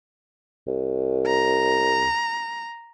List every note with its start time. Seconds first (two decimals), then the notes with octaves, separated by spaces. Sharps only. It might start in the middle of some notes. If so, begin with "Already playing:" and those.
0.67 C2
1.26 A#5